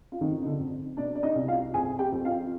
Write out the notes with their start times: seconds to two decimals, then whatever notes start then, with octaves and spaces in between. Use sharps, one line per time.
0.12 F4
0.21 F2 D#3 D#4
0.42 D#4
0.46 D3 D4
0.59 F2
0.97 B2 D4 D5
1.15 D5
1.23 D#4 D#5
1.35 C2
1.48 F4 F5
1.74 F2 G#4 G#5
1.99 G4 G5
2.12 F2
2.25 F4 F5